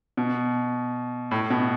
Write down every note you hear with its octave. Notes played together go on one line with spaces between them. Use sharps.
B2
A2
B2